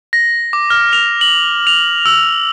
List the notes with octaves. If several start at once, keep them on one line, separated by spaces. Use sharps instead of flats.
A#6
D6
F6
F7
F#7
F7
E6